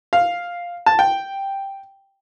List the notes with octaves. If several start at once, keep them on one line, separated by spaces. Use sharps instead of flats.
F5
A5
G5